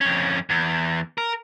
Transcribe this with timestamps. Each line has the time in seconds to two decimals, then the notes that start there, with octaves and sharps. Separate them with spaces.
0.01 F2 C#4
0.50 E2
1.18 A#4